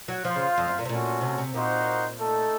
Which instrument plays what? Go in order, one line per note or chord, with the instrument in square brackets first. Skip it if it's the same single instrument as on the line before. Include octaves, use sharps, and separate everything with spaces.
[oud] F#3
[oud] F3 [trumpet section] F4 C5 F5
[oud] C#3
F2
F#2
A#2
C3
[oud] A#2 [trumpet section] A3 C#4 F#4
[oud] C3
C3
[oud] A#2 [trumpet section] A#3 D#4 F#4 C5
[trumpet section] A3 D#4 A4